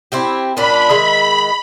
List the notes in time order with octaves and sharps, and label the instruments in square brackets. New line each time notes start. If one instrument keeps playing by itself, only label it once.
[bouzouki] C4 E4 G4
[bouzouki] A#2 C#4 D4 [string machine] B5
[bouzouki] D#3 G#3 E5